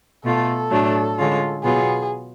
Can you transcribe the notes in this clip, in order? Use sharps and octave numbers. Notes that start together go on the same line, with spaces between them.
B2 A3 F4 A4
A2 F#3 A3 D4
D3 G#3 C#4 F4
B2 F#3 B3 F4 G#4